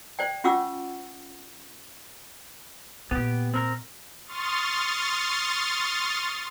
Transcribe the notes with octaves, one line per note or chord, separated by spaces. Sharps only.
C5 D5 G5
C#4 F4 F#5 C#6 D6 E6
A#2 B3 G4
C4 A#4
C6 C#6 D#6 F6 A6